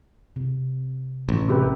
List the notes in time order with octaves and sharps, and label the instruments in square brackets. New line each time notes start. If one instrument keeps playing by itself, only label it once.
[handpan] C3
[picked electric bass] A1
[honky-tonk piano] C3 G4 B4 [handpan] C#4 F#4 A#4